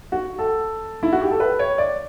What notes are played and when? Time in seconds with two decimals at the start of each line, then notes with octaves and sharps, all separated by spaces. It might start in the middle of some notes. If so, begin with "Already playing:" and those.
0.12 F#4
0.38 A4
1.03 E4
1.12 F#4
1.22 G4
1.31 A4
1.40 B4
1.59 C#5
1.78 D5